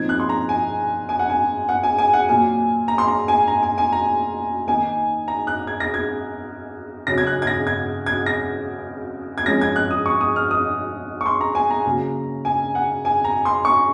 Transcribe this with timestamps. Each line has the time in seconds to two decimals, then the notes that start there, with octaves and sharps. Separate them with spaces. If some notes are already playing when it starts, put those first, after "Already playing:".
Already playing: A#2 F3 C4 D#4 G#6
0.09 F#6
0.20 C6
0.29 A#5
0.49 G#5
1.09 G#5
1.19 F#5
1.30 G#5
1.69 F#5
1.83 G#5
1.98 G#5
2.13 F#5
2.29 A#2 F#3 A#3 G#5
2.88 A#5
2.98 C6
3.08 A#5
3.28 G#5
3.48 A#5
3.63 G#5
3.78 G#5
3.92 A#5
4.67 D#3 A#3 D#4 G#5
5.28 A#5
5.47 F#6
5.67 G#6
5.80 A#6
5.94 G#6
7.07 C#3 F#3 C#4 A#6
7.18 G#6
7.27 F#6
7.42 G#6
7.47 A#6
7.67 G#6
8.06 G#6
8.26 A#6
9.38 G#6
9.46 F3 G#3 C#4 A#6
9.61 G#6
9.76 F#6
9.91 D#6
10.06 C#6
10.21 D#6
10.36 F6
10.51 D#6
11.21 C#6
11.26 C6
11.41 A#5
11.55 G#5
11.71 A#5
11.85 C#3 F#3 A#3
12.45 G#5
12.75 F#5
13.05 G#5
13.24 A#5
13.45 C6
13.65 C#6